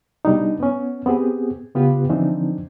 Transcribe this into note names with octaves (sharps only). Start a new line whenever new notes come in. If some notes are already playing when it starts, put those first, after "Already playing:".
B2 G3 D4 D#4
B3 C#4
B3 C4 G4 G#4
C#3 B3 F4 G4 B4
D3 E3 F3 C4 D4 D#4